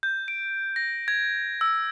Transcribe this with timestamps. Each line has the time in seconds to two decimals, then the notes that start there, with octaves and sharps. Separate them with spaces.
0.03 G6
0.28 D7
0.76 A#6
1.08 G#6
1.61 E6